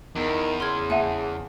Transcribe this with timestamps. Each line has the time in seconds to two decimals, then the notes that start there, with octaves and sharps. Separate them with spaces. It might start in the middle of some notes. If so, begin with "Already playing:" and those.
0.15 E2 D#3
0.60 C#3 C6 F6 G#6
0.90 A#3 E5 F#5 G#5 A5